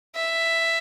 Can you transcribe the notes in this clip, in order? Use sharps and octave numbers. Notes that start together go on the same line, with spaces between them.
E5